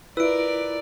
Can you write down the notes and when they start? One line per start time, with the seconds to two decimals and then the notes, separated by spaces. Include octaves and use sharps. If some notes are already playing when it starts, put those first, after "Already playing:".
0.17 E4 F4 A#4 B4 D5 E6 D7